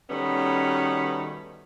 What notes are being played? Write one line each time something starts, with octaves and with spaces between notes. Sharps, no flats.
B2 D#3 G3 A3 B3 C#4